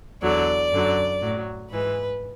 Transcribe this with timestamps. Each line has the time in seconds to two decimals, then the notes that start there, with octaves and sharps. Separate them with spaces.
0.22 E2 D3 F#3 D5
0.72 F#2 D3 F#3
1.22 A2 F#3
1.71 G#2 E3 G#3 B4